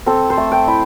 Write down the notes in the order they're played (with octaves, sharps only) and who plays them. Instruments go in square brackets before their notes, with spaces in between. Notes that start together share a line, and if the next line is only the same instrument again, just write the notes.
[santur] C4 A4
C5
A3
G5
E4